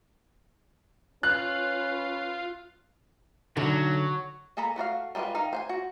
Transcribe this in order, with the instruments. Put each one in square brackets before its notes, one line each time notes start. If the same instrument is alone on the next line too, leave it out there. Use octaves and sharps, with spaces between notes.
[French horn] C#4 [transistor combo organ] F4 [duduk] B4 [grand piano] F#6
[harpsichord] B1 [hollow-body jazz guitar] D3 [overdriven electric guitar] F#3
[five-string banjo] A#3 G#4 A4 A#5 B5
A3 F#4 D5 F5
G3 G#3 B3 F4 B4
D#3 D#4 F5
C5 F#5 G#5
F#4